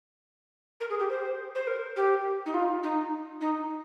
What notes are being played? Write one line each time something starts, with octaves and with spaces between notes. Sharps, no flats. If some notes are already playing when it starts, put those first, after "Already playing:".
A#4
G#4
G4
C5
C5
A#4
G4
D#4
F4
D#4
D#4